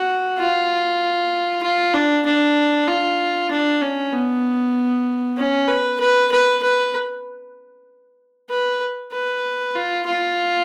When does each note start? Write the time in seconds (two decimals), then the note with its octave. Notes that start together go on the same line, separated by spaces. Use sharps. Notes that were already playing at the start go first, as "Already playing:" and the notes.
Already playing: F#4
0.38 F4
1.62 F4
1.94 D4
2.25 D4
2.88 F4
3.51 D4
3.81 C#4
4.12 B3
5.37 C#4
5.68 B4
6.00 B4
6.32 B4
6.63 B4
8.50 B4
9.12 B4
9.75 F4
10.06 F4